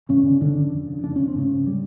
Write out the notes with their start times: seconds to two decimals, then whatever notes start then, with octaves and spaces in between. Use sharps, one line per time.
0.09 G2 C#3 C#4
0.25 D3
0.41 G2 D3 D4
0.57 D3
0.72 F2
0.88 C#3
1.04 F2 D4
1.16 C#3 C#4
1.28 C4
1.35 G#2 C#3 C#4
1.67 G3